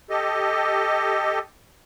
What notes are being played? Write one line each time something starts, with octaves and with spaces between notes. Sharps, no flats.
G4 A4 D#5